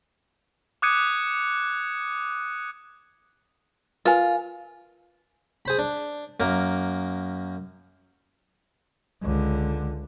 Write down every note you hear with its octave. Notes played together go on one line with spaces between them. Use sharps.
D6 D#6 F#6 G#6 C#7 D#7
F4 A#4 B4 G#5
G#4 C5 B5
D4
F#2 A#3
C#2 D3